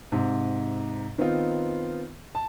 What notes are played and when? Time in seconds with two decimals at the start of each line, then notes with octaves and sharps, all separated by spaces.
0.12 G#2 C3
1.18 D#3 B3 C4 D#4 F4
2.35 A5